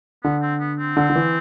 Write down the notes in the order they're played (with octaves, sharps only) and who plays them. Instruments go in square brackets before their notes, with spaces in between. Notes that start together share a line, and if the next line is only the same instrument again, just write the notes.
[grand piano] D3 [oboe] B3
[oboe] C4
B3
C4
[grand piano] D3
D3
E3